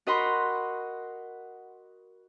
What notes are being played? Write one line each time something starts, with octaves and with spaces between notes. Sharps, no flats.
F#4 A#4 D#5 F#5 B5 C6